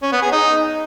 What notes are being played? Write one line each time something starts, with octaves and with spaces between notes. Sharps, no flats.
C#4
B3
G#4
D#4